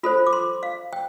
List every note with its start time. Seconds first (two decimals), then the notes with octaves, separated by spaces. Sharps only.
0.03 F4 A4 C5 B5
0.27 D6
0.33 C6
0.63 F5
0.93 G5